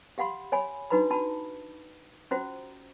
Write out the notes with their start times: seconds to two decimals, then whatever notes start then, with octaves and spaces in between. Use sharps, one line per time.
0.18 G4 F5 F#5 B5 C6
0.52 C#5 G#5 B5
0.90 D4 D#4 F#4 B4 A#5 B5
1.10 D4 F#4 A5 B5
2.31 C#4 F4 F#4 C5 A#5